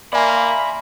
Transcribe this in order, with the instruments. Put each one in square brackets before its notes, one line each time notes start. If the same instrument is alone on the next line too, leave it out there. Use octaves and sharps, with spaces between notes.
[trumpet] A#3 [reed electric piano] D5 G#5 C6 [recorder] E5 [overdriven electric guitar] B5